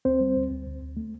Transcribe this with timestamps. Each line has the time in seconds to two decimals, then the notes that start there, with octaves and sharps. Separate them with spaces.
0.05 D2 C4 C5
0.20 G3
0.36 D2
0.51 D2
0.66 D2
0.82 D2
0.97 A3